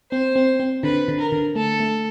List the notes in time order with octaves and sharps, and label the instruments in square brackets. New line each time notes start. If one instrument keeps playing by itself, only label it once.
[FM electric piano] C4 [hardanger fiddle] C5
[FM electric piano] C4
C4
[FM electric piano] D3 [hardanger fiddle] B4
[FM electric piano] D3
[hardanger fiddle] A#4
[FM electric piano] D3
[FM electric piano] A3 [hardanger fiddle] A4
[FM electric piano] A3